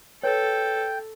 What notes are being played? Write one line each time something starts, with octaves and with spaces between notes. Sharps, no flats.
A4 B4 C#5 G5